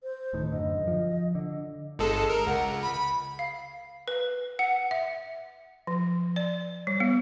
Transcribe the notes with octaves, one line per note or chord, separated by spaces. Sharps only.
C5
D1 A2 D#3
F#2 D3 D#5
F3
D3
G1 G#3 A4
A#4
C#2 F#5
B5
F5
B4
F#5
E5
F3
D5
G3
B3